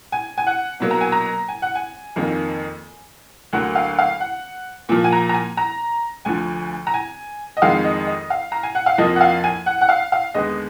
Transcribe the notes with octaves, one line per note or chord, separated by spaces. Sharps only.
G#5
G#5
F#5
B2 F#3 A#3
A#5
G#5
A#5
G#5
F#5
G#5
F2 D#3 A#3
D2 D3 F#3 A#3 F#5
F5
F5
F#5
A#2 F3 A#3
G#5
A#5
A#5
G#5
A#5
D2 D3 F3 G#5
A#5
G#5
D#5
F2 D#3 G#3 F5
D#5
D#5
F5
A#5
G#5
F#5
F5
F2 F3 A#3 D#5
F#5
F5
G#5
F#5
F#5
F5
F5
D#2 D3 G#3 B3 D#5